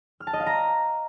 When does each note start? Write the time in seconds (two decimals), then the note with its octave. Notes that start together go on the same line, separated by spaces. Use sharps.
0.20 F6
0.27 A5
0.33 D#5
0.40 F5
0.46 A#5